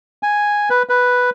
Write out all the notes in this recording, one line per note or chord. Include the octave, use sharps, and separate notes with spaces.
G#5
B4
B4